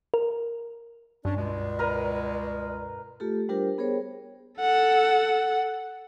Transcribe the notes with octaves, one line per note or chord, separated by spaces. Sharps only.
A#4
G2 C#4 D4 D5
C#2 B2 G#3
A#4 B4 A#5
A3 F4 G4 A4
G3 D4 F4 G4 A#4 C5
B3 G#4 A#4 C5 C#5 G5
A4 F#5